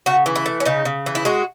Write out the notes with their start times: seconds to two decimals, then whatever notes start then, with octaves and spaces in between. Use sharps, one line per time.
0.06 C#3 F#4
0.26 E3
0.36 E4
0.46 A3
0.60 C#4
0.65 C#3 D#4
0.85 C#3
1.06 E3
1.15 E4
1.25 G#3 F#4